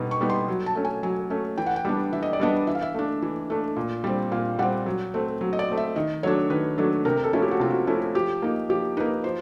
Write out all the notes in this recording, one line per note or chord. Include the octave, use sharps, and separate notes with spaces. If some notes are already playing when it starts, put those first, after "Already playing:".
Already playing: B2 G3 B3 D#4
C#6
G3 B3 D#4
C6
F#3
A5
A3 C#4
G#5
F#3 G#5
A3 C#4
E3 G5
F#5
G5
G3 B3 D4
E3 E5
D#5
D5
G3 B3 D4 D#5
E3 E5
F5
E5
A3 D4
E3
A3 D4
A#2
G3 C4
A#2 F5
G3 C4 F#5
F#3
A3 C4
F#3
D#5
D5
A3 C4
E5
D#3 D#5
F#3 A3 D4 C#5
D#3 B4
F#3 A3 D4
C3 A#4
A4
F3 A3 C#4 E4
G4
F#4
C3 F4
F#4
F3 A3 C#4 E4
F3 G4
A#3 D#4
F3 G4
A#3 D#4 B4
F3 C5